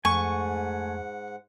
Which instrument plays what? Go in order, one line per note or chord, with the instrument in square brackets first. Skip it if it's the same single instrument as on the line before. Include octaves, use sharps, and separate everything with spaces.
[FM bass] F2 [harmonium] G#2 F#5 [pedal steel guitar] A3 G#5 [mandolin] C#6